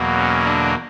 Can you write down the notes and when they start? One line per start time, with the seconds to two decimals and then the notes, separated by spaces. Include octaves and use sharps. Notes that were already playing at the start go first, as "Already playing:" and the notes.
Already playing: E2 B2 F#3 A#3
0.15 C#4
0.45 D3 D4